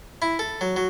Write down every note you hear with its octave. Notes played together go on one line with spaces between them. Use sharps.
E4
A4
F#3
F#3